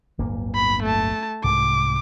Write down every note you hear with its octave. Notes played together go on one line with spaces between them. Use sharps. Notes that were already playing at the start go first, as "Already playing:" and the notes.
D1 G1 A#3
B5
A3 A5
C2 G#2 C3 D6